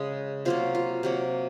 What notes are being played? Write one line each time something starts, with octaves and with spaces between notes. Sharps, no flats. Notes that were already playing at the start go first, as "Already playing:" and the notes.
Already playing: C#3 G#3
C3 F#3 A#3 F4
F4
C3 F#3 A#3